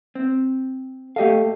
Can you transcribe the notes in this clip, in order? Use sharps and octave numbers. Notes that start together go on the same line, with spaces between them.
C4
A3 G4 A4 D#5 F5